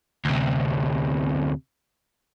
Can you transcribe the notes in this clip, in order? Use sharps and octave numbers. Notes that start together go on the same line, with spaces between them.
D2 C3